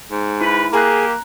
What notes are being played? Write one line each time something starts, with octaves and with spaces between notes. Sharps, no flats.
G#2
E4 B4
A#3 G4 G#4 A#5 F#6